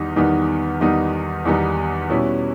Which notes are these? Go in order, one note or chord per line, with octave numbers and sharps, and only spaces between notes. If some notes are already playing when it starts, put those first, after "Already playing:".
Already playing: E2 D#3 G3 B3 D#4
E2 D#3 G3 B3 D#4
E2 D#3 G3 B3 D#4
E2 D#3 G3 B3 D#4
B2 G3 C#4 E4